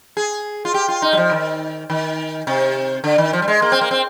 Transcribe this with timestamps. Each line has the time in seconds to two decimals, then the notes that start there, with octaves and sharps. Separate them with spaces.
0.17 G#4
0.65 F4
0.74 G4
0.88 F4
1.02 D#4
1.13 G3
1.17 F3
1.31 D#3
1.90 D#3
2.47 C3
3.04 D3
3.18 D#3
3.33 F3
3.42 G3
3.48 G#3
3.62 A#3
3.72 C4
3.81 A#3
3.91 C4